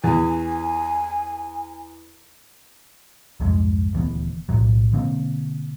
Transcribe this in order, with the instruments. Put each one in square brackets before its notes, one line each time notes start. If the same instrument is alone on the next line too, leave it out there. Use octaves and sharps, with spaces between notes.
[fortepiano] E2 [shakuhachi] G#5
[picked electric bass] C2 F2 G#2 G#3
D#1 D2 E3 B3
B1 A2 F#3
B2 D3 A#3 C4